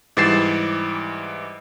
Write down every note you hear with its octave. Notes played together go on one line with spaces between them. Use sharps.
G#2 E3 G3 A6 C7 E7